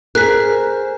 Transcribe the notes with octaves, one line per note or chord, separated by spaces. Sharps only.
G#4 A#4 C5 F#6 B6